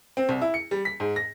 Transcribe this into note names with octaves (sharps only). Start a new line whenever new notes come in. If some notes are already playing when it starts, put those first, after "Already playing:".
C4
C2
E4
C#7
G3
B6
G#2
A#6